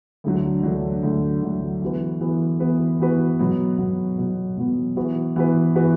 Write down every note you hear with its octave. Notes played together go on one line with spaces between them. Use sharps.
D2 D3 F#3
D2 D3 F#3
D2 D3 F#3
D2 D3 F#3
E3 B3 F#4 B4
E3 B3 F#4 B4
E3 B3 F#4 B4
E3 B3 F#4 B4
B2 F#3 B3
B2 F#3 B3
B2 F#3 B3
B2 F#3 B3
E3 B3 F#4 B4
E3 B3 F#4 B4
E3 B3 F#4 B4